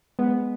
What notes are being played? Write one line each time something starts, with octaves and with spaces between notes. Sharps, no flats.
G#3 B3